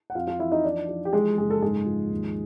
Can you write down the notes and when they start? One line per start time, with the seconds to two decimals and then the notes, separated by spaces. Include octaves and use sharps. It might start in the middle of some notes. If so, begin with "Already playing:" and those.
0.10 F#5
0.15 F2 F4 F5
0.27 F4 F5
0.39 E3 E4 E5
0.52 D#4 D#5
0.64 F3 D4 D5
0.89 F3
1.05 G4
1.13 E3 G#3 G#4
1.37 F#1 G#4
1.50 A4
1.62 G#2 G#3 G#4
1.86 F3
2.11 D#2